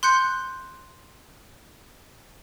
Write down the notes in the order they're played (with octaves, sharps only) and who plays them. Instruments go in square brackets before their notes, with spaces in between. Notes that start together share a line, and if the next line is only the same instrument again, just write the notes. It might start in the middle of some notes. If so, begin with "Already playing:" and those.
[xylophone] C6 F#6 G6 C#7